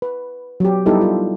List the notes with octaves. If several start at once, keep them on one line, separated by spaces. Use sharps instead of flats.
B4
F#3 G4
G3 B3 D#4 E4 G4 A4
F4